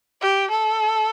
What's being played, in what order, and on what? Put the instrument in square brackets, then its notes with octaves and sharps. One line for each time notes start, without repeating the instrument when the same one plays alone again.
[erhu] G4
A4